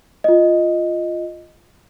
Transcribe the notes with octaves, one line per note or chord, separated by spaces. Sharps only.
F4 D#5